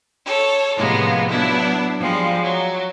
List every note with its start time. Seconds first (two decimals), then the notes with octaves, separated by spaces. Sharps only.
0.24 A4 C#5
0.76 A2 C3 F3 G#3 A#3 B3
1.28 F#3 B3 D4 E4
1.98 F3 G3 G#3
2.41 F#3